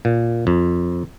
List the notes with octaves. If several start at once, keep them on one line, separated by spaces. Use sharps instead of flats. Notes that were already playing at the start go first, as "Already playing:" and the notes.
A#2
F2